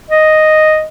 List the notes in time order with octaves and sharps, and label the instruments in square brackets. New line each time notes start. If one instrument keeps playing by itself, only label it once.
[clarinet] D#5